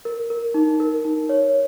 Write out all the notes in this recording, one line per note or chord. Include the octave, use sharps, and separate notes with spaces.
A#4
A#4
D#4
A#4
D#4
C#5